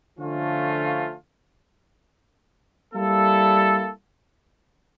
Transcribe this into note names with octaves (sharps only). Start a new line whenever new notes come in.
D3 F3 A3 C#4 F4
G3 A#3 E4 A4